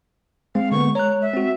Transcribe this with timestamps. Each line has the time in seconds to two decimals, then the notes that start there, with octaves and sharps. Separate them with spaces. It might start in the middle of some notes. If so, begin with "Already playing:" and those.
0.55 G#3 C4 F5
0.72 D3 A#3 B3 C#6
0.95 C#5 A#5 F#6
1.22 E5
1.33 C4 F#4